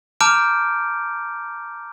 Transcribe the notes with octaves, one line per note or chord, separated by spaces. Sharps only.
A5 A#5 D6 F6 G6 D7